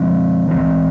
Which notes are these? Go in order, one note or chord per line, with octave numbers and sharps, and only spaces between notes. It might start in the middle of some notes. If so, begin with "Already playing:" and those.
Already playing: F3 G#3 C4
E3 G#3 C4